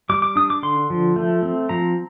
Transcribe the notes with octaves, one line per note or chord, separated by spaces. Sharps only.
G3 D6
D6
D4 D#6
D6
D3 C6
F3
A3
C4
F3 A#5